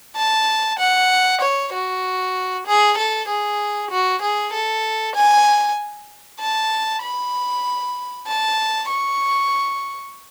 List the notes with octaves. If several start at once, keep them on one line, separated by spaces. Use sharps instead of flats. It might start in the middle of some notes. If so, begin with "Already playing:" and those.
A5
F#5
C#5
F#4
G#4
A4
G#4
F#4
G#4
A4
G#5
A5
B5
A5
C#6